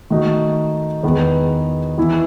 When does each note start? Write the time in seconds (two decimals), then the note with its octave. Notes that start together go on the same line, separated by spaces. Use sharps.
0.10 D#3 A3 D#4 F#4
1.03 E2 D#3 G#3 B3 D#4
1.98 E3 B3 E4